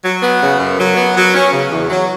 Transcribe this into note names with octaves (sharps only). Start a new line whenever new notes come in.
F#3
B3
C#3
F#2
F#3
B3
F#3
C#4
C#3
E2
F#3